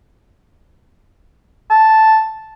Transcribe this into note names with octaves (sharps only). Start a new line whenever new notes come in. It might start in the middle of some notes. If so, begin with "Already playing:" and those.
A5